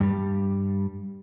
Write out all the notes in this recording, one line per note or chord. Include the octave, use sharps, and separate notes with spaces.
G2 G3